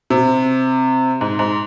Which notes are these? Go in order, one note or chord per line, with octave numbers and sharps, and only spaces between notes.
C3
G#2
G#2